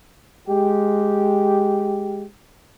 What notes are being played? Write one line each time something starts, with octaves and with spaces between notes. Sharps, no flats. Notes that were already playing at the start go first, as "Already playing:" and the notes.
G#3 G4